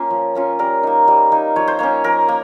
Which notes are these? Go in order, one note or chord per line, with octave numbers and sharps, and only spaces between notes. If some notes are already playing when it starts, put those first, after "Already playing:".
Already playing: A#3 C#4 F4
F3
A#3 C#4 F4
G3 A#4
A#3 D#4
G3
A#3 D#4
F3 C#5
C5
A#3 C#4 C#5
F3 A#4
A#3